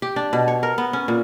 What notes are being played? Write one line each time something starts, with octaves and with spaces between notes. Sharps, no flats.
G4
D4
B2
C#5
A#4
B3
C#4
A#2